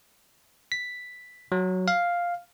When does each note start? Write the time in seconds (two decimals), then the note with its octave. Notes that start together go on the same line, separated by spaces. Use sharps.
0.72 B6
1.52 F#3
1.88 F5